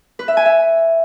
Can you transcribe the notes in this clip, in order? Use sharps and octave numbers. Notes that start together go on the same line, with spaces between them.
B4
E5
G#5
E5